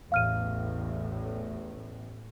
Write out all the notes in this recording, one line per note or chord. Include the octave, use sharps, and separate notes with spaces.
A1 E2 A2 F5 F6 D#7